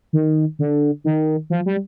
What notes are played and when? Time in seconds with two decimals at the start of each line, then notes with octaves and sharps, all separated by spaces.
0.13 D#3
0.59 D3
1.04 D#3
1.50 F3
1.66 G3